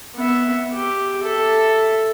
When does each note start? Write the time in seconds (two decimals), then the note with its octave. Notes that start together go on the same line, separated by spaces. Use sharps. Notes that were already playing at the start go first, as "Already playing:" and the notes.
0.16 B3 E5
0.73 G4
1.23 A4 E5